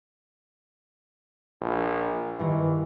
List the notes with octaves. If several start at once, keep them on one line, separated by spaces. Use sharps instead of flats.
A#1
G2 D#3 E3